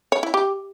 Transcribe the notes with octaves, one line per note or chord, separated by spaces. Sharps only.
C#5
E4
G4